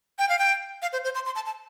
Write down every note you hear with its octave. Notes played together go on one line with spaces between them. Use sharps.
G5
F5
G5
F5
C5
C5
C6
C6
A5
A5